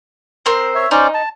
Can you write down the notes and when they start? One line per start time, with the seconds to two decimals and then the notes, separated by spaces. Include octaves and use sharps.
0.46 C4 A#4 C5
0.75 C#5 E5
0.91 C#4 D#4 C5 D5
1.14 A5